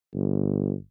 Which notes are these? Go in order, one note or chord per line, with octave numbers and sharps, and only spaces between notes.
G1